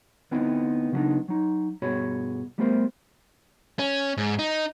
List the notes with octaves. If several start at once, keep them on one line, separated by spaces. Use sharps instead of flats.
D2 B3 C4 D#4 E4 G5
C#3 F#3 G3 B3 D4 D#4
F#3 D#4
G2 B2 F#4 G#4 C#5 B5
G3 A3 B3 G4 A#4 C5
C#4
G#2
D#4